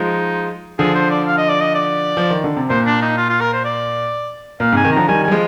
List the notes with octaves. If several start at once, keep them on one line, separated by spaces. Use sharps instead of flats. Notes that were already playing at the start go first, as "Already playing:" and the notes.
Already playing: F3 G#3 D#4
D3 F3 G#4
C5
D5
F5
D#5
D5
D#5
D5
F3
D#3
D3
C3
A#2 C5
D4
D#4
F4
F4
A#4
C5
D5
A#2 F5
G#2 C3
G#5
C3 D#3
D3 F3 A#5
D#3 G3 G#5
G3 G#5
F3 G#3